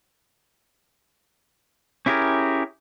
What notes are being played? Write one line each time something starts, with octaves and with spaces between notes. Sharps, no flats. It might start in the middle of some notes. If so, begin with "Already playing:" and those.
C#4 E4 G4 G#4 A#4